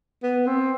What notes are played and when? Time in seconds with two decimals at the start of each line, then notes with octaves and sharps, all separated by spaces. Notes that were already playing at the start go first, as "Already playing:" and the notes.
0.23 B3
0.47 C4